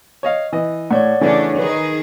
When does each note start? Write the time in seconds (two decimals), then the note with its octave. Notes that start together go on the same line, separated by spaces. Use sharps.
0.23 C#5 D#5 F5
0.53 E3 D#5
0.91 A2 C#5 D5 F#5
1.21 C#3 E3 A3 C#4 D4
1.58 D#3 G#4 B4